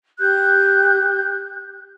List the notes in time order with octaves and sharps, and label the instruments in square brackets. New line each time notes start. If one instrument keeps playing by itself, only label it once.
[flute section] G4 F#6 G6